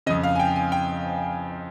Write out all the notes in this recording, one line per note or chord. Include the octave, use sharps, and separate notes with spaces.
F2 C#3 D#5
F5
G#5
G5
G#5
G5